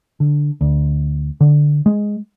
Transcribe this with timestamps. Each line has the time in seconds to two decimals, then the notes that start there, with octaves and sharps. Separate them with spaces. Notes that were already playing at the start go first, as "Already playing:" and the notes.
0.20 D3
0.61 D2
1.41 D3
1.86 G#3